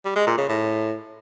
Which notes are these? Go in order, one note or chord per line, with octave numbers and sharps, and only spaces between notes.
G3
G#3
A#2
C#3
A2